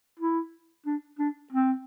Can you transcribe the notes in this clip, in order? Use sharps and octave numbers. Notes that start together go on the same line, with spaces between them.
E4
D4
D4
C4